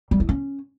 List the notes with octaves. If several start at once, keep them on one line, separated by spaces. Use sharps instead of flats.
G3
E4
C#4